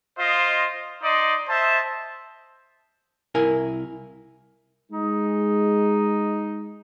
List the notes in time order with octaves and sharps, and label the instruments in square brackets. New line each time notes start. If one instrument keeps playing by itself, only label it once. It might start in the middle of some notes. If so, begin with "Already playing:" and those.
[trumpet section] F4 C5 D#5
D#4 D5 D#5 C6
C5 D#5 E5 A5
[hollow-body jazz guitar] C2 E4 A#4 G#5
[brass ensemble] G#3 [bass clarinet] D#4